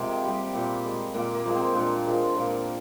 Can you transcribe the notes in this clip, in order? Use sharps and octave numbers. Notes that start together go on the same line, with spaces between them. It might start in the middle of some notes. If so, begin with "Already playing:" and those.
Already playing: C3 F3 G#3 A#3 C4
G3
A#2
G#3
A#2 A#3
A#3
F3 G#3
C4
A#2 D4
F3 G#3
A#2 A#3